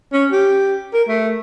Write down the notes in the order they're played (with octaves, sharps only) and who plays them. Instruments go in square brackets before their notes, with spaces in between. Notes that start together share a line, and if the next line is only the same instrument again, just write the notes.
[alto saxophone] C#4
G4
A#4
A3